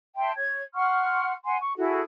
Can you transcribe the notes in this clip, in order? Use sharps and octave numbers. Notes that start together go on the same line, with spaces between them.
E5 G5 A5 C6
C#5 G#6
F#5 C6 C#6 F6
F#5 G#5 C6
C#6
E4 F#4 G#4 A4